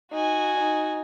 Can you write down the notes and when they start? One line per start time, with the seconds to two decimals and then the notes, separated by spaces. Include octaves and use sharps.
0.12 D#4 F#4 G#5
0.58 D#4